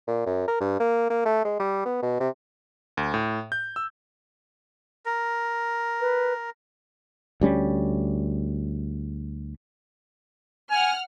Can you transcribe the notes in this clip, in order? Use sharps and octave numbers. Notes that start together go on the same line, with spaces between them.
A#2
F#2
A#4
G2
A#3
A#3
A3
G#3
G3
B3
B2
C3
D2
A2
G6
E6
A#4
B4
D2 G3 C#4
F#5 G#5 F6